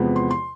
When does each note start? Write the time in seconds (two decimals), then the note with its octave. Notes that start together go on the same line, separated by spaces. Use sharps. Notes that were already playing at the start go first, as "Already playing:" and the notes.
Already playing: E2 C3 F3 G#3 B3
0.16 C6
0.31 C6